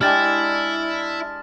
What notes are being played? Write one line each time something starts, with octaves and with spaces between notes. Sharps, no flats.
G#3 D4 E4 G4 D5 G5 F6 A6